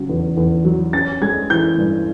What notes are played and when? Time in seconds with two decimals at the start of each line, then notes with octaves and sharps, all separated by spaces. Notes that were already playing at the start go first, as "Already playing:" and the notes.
Already playing: C#3 F#3
0.09 E2
0.37 E2
0.65 F#3
0.93 C#4 A6
1.22 G#3 G#6
1.50 E3 G6
1.78 G2